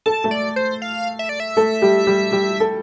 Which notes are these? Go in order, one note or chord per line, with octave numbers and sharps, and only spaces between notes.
A4 A5
A3 A4
D5
C5
F5
E5
D5
E5
A3 A4
G3 G4
G3 G4
G3 G4
A4